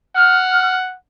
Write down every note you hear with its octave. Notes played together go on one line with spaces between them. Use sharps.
F#5 F6